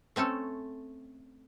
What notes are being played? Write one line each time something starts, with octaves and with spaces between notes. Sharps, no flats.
A3 C4 C#4 A4